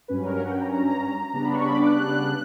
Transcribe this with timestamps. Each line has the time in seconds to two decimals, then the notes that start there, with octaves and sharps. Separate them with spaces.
0.08 G2 F#3 C#4 B4
0.25 A#4
0.40 F#5
0.51 G5
0.61 A#5
0.72 A#5
1.33 C#3 G3 B3 D4 A#5
1.44 B5
1.55 C#6
1.66 B5
1.76 D6
1.86 F#6